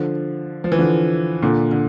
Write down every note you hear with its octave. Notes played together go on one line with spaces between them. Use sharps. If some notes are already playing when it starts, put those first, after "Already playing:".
Already playing: D3 F3
F3
E3
D3 F3
A#2 D3
D3